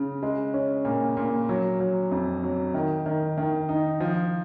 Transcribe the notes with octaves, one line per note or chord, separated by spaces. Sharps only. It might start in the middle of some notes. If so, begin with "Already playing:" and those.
Already playing: C#3
G#3
C#4
A#2
A#2
F#3
F#3
F2
F#3
D#3
D#3
D#3
D#4
F3